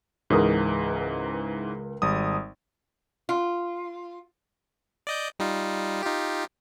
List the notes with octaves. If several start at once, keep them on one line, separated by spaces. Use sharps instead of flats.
C#2 G#2 E3 A#4 D#6
G#1 G3 D#6
F4
D5 D#5 G6
G3 D#4 F4
D#4 F4 G4